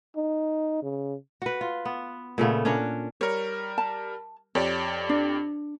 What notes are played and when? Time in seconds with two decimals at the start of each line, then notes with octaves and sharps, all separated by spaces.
0.16 D#4
0.82 C#3
1.42 F#4 B4
1.61 F4
1.85 B3
2.38 A#2 C#3 A3 B3
2.65 C#4 D4 A#4 C#5
3.21 G3 A#4 C#5
3.78 A5
4.55 F2 G4 C#5 D5
5.09 D4